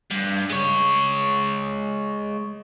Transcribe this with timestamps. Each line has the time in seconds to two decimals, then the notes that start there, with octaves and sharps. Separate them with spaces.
0.11 G2
0.50 G#3 C#5